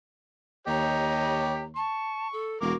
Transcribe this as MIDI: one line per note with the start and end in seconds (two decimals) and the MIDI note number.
0.67 1.89 39
0.67 1.64 67
0.67 1.64 73
0.67 1.64 75
0.67 1.65 82
1.76 2.27 81
1.76 2.51 85
2.32 2.58 69
2.61 2.74 28
2.61 2.73 66
2.61 2.74 70
2.61 2.74 86